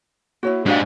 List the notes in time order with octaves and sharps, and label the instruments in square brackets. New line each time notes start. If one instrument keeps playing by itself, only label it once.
[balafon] A#3 C#5 [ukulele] E4 F#4
[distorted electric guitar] G#2 G#3 [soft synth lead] D4 [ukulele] F#4 G4 F5